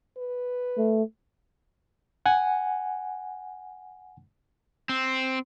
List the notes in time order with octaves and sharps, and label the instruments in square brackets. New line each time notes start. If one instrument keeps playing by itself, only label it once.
[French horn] B4
[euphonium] A3
[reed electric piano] F#5 G#5
[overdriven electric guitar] C4